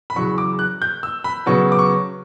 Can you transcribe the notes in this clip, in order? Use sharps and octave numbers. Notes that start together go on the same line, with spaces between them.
B5
E2 C#3 F#3 C#6
D6
F#6
G6
E6
B5
C#3 F#3 B3 C#6
D6
C#6